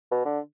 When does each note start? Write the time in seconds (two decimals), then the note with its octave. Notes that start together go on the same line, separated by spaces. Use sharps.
0.11 B2
0.25 D3